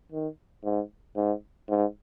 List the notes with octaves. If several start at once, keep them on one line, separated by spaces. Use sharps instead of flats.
D#3
G#2
G#2
G#2